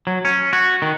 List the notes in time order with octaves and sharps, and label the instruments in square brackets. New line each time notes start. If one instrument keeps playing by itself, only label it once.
[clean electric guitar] F#3
C#4
F#4
D#3